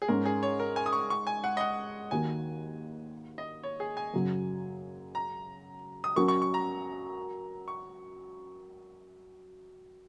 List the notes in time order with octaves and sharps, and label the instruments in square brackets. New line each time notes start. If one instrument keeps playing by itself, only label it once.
[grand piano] G#4
[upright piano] G#2 G#3 C#4 [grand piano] A#4
[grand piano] G#4
C#5
A#4
G#5
D#6
C#6
C#6
G#5
F#5
D#5
F#5
[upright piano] D#2 D#3 A#3 F#4 [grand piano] G#5
[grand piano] D#5
C#5
G#4
G#5
[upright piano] F#2 C#3 F#3
[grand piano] A#5
D#6
[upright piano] F#3 C#4 A#4 [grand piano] C#6
[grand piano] C#6
C#6
A#5
C#6